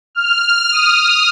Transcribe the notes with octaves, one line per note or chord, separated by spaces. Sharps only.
F6
D#6